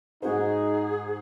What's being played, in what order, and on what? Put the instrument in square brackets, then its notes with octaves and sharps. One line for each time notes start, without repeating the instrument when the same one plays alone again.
[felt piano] G#2 F#4 C5 [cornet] D#4 [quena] G#4